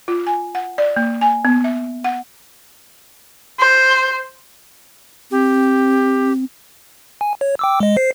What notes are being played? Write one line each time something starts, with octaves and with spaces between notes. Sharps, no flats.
F4
G#5
F#5
D5
A#3
G#5
B3
E5
F#5
C5
C4 G4
G#5
C#5
G5 D6 E6
G#3 D#5
C5 C7